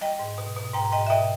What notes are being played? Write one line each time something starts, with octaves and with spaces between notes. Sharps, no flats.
G3 D#5 G5
G#2
B2
B2
G#2 G5 A#5
G#2 D#5 G5
E5
B2 D#5 G5